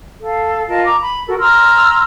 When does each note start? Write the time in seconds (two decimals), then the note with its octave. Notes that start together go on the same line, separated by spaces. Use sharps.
0.20 A4 F5
0.68 F4 A#4 D#5 A5
0.84 A#5 D6
1.01 B5
1.27 F#4 A4 A#4
1.40 A#5 C6 E6 F6